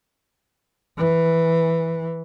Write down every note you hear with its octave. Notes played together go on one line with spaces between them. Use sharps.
E3